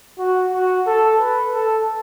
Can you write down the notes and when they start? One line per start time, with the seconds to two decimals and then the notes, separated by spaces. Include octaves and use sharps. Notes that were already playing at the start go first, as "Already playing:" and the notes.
0.19 F#4
0.52 F#4
0.86 A4
1.19 B4
1.53 A4